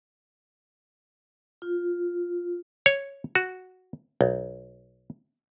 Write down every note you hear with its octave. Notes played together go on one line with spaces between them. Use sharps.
F4
C#5
F#4
B1